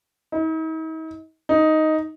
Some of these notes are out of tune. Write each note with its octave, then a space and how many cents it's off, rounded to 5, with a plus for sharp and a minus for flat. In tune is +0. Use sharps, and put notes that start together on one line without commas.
D#4 +45
D#4 +5